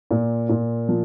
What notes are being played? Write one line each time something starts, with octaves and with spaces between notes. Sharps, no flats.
A#2
A#2
F3